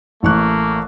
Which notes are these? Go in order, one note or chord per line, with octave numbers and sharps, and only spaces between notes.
A1 A3 A#3 C#6 F#6